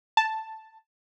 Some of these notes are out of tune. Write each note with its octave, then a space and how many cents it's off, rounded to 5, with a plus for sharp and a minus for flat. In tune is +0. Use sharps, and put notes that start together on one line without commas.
A5 +0